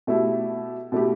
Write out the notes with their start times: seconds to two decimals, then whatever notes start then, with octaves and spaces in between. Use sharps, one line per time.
0.07 B2 A3 E4 G4
0.92 B2 A3 E4 G4